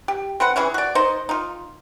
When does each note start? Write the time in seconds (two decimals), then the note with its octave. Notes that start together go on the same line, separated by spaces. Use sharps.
0.08 G4
0.40 C4 B4 F#5
0.56 E3 C#4 E4 G#4
0.74 F#4 D5
0.95 D#4 C5 D#5
1.29 D#4 F4